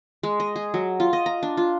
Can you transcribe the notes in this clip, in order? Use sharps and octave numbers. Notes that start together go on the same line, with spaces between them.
G#3
D#5
G#4
F#3
F4
D#5
A#5
D4
F4